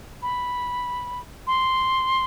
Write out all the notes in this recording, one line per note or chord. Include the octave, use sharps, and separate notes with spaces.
B5
C6